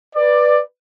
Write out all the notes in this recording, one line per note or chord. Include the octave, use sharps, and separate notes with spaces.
B4 D5